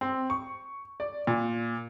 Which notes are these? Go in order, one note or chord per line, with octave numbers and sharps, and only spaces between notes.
C4
C#6
D5
A#2